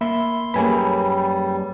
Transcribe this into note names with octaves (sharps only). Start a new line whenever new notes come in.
A#3 E5 B5 C6
F#2 G3 A#3 G#4 B4 C#5 G#5 B5